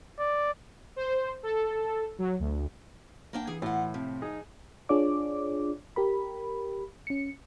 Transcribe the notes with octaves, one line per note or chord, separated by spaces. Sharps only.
D5
C5
A4
F#3
D2
A#3 D4 G5
E3 G#4
A2 F4 F#5
C3 F3
D#4 G#4
D4 F4 G#4 C#5 D5 D6
G4 A#4 B5
C#4 C#7